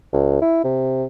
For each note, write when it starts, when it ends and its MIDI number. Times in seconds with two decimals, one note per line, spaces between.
0.13 0.39 37
0.42 0.59 64
0.64 1.04 48